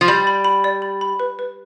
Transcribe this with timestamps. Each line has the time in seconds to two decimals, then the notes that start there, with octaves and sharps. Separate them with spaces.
0.01 F3
0.08 G3 B5
0.27 B5
0.44 B5
0.64 D5
0.82 B5
1.01 B5
1.20 B4
1.39 B4